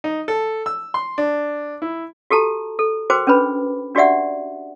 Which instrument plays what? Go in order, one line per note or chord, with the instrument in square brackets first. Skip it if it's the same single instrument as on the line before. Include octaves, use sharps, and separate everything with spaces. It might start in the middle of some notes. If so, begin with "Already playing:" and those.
[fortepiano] D#4
A4
E6
C6
D4
E4
[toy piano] F#4 G4 A4 A5 A#5
A4
F#4 A#4 C5 G5 D6
C#4 D4 B4 B5
D4 F#4 G4 D5 E5 F#5